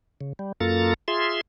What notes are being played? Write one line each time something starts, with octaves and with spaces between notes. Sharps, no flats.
C#3
G3
F#2 A#3 F4 A4 A#5 A6
F4 G#4 E5 C6